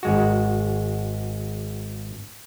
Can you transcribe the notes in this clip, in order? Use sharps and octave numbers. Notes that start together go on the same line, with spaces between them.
G#1 G#3 F#4